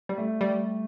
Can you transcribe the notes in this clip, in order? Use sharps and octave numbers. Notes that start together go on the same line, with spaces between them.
G3
A3
G3